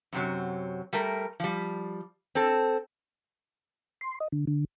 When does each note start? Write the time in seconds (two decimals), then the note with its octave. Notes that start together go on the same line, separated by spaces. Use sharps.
0.13 F#2 C3 F#3
0.93 G3 A3 A#4
1.40 F3 G3
2.35 C4 A4
4.01 C6
4.20 D#5
4.32 D3
4.47 D3